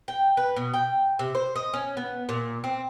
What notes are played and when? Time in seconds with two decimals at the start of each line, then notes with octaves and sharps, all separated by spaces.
0.08 G5
0.37 B4
0.56 B2
0.74 G5
1.19 C3
1.35 C5
1.56 D#5
1.74 C#4
1.97 B3
2.29 A#2
2.64 C4